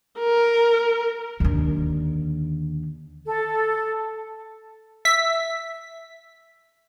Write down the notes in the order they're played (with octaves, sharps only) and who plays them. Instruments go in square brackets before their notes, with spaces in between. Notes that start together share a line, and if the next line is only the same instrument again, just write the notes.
[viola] A#4
[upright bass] D#2 D3
[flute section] A4
[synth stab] E5 B6